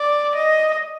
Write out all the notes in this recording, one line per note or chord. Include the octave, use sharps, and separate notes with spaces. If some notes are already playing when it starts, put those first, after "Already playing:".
Already playing: D5
D#5